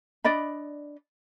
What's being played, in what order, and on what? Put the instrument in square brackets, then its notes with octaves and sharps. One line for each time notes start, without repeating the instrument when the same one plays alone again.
[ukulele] D4 D5 D#5 B5